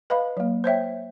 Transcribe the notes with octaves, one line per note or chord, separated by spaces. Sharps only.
B4 D#5 F5 B5
F#3 A#3
C5 C#5 E5 G5